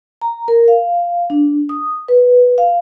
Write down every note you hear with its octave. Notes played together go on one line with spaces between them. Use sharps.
A#5
A#4
F5
D4
D#6
B4
F5